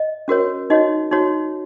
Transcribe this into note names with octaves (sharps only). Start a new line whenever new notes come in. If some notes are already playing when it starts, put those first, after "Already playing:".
Already playing: D#5
C#4 F#4 A#4 C#5
D#4 F#4 C#5 D#5
D#4 F#4 C#5